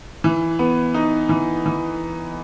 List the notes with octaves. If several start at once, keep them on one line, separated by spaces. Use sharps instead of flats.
E3
B3
D#4
E3
E3